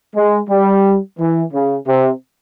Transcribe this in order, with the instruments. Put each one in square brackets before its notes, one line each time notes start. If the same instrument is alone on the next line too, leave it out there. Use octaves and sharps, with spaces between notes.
[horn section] G#3
G3
E3
C#3
C3